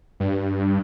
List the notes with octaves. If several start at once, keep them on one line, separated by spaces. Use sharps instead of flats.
G2